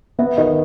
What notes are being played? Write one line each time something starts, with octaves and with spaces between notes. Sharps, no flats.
B3 E5
D#3 D#5